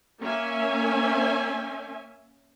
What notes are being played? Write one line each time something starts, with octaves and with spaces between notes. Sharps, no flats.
A#3 C#4 E5 G#5